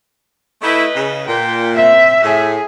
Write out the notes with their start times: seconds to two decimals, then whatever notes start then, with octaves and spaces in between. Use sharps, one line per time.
0.62 A3 E4 B4 D#5
0.94 C#3
1.27 A#2 G5
1.76 C4 E5
2.22 A2 G#4